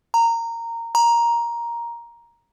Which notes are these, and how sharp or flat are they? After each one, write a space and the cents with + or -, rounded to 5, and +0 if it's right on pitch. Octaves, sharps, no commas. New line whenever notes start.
A#5 -15
A#5 +10